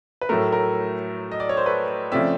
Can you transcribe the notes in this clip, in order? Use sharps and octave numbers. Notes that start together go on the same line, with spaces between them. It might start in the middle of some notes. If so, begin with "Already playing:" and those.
B4
A2 F#3 A3 A#4
A#4
D#5
D5
C#5
C5
A4 B4
C#3 F3 A3 C4 D5 E5